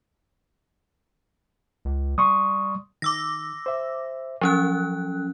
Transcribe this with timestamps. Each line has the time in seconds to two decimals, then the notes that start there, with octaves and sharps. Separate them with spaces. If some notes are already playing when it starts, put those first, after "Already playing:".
1.85 C#2
2.18 G3 C6 C#6 D#6
3.02 D#3 D6 E6 A#6
3.66 C5 E5
4.41 F3 F#3 C#4 A4 G5 F#6